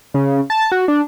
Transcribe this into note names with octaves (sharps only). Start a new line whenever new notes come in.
C#3
A5
F#4
D4